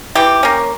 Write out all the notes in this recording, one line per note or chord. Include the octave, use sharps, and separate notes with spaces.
E3 G4
A#3 C#4